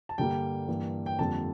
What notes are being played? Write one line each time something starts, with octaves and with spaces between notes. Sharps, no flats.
A5
G2 D3 G3 A#3 G5
G2 E3 A#3
G5
F2 D3 G3 A#3 A5